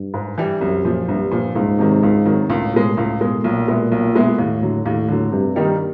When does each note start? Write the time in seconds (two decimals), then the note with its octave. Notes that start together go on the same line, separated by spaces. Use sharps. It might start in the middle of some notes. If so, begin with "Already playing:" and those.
Already playing: G2
0.14 G#2
0.38 E3 G3
0.61 C2 F#2
0.85 A#2 F3
1.08 C2 G2
1.31 A#2 F3
1.55 C#2 G#2
1.79 C3 D#3 F#3
2.03 C#2
2.26 C3 D#3 F#3
2.49 C#2 A2
2.73 B2 G#3
2.97 C#2
3.21 B2 G#3
3.44 B1 A#2
3.68 B2 G#3 B3 E4
3.92 B1
4.14 B2 G#3 B3 E4
4.38 D#2 A2
4.62 D3 F#3
4.86 D#2 A2
5.08 D3 F#3
5.32 G2 C3
5.56 D#3 G3 A#3 D#4